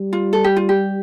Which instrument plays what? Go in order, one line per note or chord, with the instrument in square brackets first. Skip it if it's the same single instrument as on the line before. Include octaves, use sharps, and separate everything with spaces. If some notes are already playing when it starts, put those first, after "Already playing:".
Already playing: [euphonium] G3
[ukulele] F4
A4
G4
F4
G4